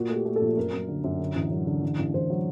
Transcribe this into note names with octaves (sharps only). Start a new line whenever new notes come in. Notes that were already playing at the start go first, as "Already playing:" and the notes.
Already playing: A#2 F#4
A3
G4
A3
A4
A#1
F#2 A#4
F#2
D3
F#2
D3
A1
F#3
D3
A1
A1
A1 C5
F#3